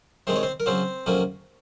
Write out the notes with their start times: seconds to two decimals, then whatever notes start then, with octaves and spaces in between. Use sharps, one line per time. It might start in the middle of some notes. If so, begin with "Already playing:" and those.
0.27 C3 D#3 G#3 C4 C5
0.36 C#5
0.43 C4 C5
0.60 A#4
0.66 C#3 F#3 C4 C#4 C5
1.06 F2 C3 F#3 A#3 C#4